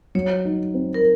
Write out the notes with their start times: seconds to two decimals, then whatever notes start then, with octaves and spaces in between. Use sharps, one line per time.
0.15 F#3 C#5
0.45 D#4
0.74 C4
0.94 A#4